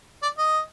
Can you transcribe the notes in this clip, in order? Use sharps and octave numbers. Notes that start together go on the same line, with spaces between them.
D5
D#5